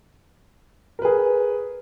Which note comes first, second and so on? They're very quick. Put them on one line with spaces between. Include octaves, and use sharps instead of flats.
A#4 B4 G#4